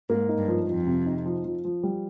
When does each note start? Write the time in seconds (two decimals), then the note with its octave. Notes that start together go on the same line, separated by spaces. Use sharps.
0.09 G#2 A#3
0.29 D#4
0.38 G2
0.48 F3
0.67 F2 F3
0.86 C3
1.06 D#4
1.26 F3
1.45 F3
1.65 F3
1.83 G3